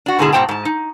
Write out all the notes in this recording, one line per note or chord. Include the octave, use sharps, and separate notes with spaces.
D4 F#4
G#2 B2 D3 E4 G#4 A5
G#2 B2 B3 C5 G5 A5
G#2 A5
D#4